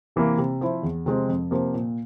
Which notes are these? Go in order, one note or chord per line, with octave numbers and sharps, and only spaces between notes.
C3 E3 A#3
C3
F3 C4 E4
E2
C3 F3 G#3 C4
F2
C3 F3 A#3
A#2